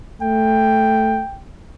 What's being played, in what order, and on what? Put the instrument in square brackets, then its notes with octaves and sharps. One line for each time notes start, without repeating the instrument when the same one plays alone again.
[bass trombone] A3 [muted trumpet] G5